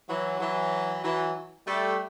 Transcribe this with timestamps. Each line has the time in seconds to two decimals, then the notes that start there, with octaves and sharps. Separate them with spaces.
0.08 E3 F#3
0.40 E3 F#3
1.04 E3 F#3
1.67 G3 A3